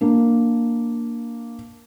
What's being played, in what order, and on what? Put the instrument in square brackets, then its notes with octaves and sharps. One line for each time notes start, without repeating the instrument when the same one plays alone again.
[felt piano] A#3 D4